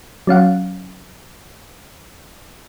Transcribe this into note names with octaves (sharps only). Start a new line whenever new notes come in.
F#3 C#4 F5 F#5